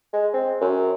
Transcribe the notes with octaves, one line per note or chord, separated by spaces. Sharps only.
G#3
C4
F#2